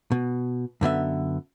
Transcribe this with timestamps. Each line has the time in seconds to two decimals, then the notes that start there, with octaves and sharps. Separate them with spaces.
0.12 B2
0.81 F#2 D3 B3 E5